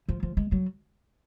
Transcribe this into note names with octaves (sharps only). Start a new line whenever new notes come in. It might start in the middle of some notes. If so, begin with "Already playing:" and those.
F3
F3
G#3
F#3